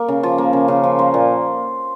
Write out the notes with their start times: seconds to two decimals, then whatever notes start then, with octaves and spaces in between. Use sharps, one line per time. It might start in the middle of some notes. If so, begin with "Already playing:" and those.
Already playing: A#3 A#4
0.08 C#3
0.23 F3
0.38 A#3
0.53 C#3
0.68 C#3
0.84 F3
0.99 A#3 C5
1.14 A#2